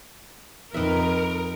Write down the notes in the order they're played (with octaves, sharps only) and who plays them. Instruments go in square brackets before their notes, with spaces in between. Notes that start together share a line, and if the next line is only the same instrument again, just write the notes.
[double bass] F2 [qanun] D#4 B4 E5 [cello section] A#4